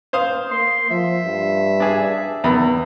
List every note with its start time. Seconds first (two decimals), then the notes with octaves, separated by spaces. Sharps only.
0.13 C5 F5 D#6
0.51 A#3 C6
0.90 F3 E5
1.25 G2
1.80 D4 G#4
2.44 E2 D#3 B3 B5